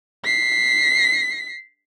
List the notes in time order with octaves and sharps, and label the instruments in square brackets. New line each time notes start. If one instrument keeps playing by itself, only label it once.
[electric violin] B6 C7